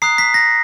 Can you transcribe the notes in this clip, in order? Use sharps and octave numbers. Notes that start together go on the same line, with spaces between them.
A#5 D#6 F#6 C7
B6
A#6